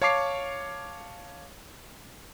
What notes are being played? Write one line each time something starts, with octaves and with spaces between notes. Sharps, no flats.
C#5 F5 A5 C#6 D6 C7